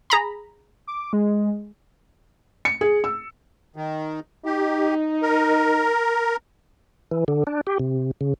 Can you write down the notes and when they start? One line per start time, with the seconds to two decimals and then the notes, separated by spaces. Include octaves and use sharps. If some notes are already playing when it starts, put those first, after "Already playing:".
0.10 G#4 A#5 B5
0.87 D6
1.13 G#3
2.65 C#7
2.81 G#4
3.04 E6
3.76 D#3
4.46 D#4 G4
5.22 A#4
7.11 E3
7.28 D3
7.47 D4
7.67 G4
7.80 C3
8.21 C#3